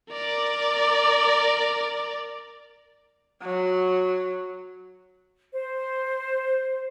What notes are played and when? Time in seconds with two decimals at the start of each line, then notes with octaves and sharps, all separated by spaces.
0.11 A#4 D5
3.43 F#3
5.53 C5